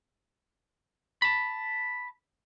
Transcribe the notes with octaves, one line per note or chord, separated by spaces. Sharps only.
A5 B5